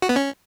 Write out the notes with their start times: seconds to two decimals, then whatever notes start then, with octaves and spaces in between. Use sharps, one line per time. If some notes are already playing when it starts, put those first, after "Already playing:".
0.02 F#4
0.09 B3
0.16 C#4